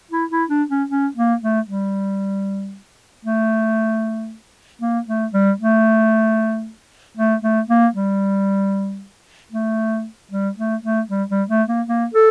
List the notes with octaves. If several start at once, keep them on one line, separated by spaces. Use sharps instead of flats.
E4
E4
D4
C#4
C#4
A#3
A3
G3
A3
A#3
A3
G3
A3
A3
A3
A#3
G3
A3
G3
A3
A3
G3
G3
A3
A#3
A#3
A4